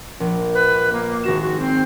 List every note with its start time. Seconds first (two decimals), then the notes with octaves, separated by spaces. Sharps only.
0.20 A#1
0.54 B4
0.93 A#3
1.24 G#1 F#4 A#6 E7
1.41 F#4
1.59 C4